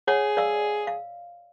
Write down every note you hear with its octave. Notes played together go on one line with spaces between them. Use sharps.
G#4 C#5 F#5
D5 F5 E6
F5